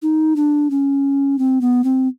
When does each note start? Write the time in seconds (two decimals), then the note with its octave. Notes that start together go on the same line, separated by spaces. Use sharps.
0.02 D#4
0.36 D4
0.70 C#4
1.39 C4
1.61 B3
1.84 C4